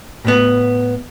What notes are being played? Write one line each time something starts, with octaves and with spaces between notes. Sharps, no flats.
A2 B3